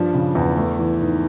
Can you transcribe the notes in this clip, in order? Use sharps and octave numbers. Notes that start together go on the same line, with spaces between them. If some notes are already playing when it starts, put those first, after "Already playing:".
Already playing: G2 F3 D4
C#3
E2
A3
E3
G#2